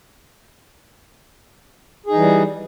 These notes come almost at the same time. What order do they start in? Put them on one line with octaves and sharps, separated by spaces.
G#4 D#4 E3 G3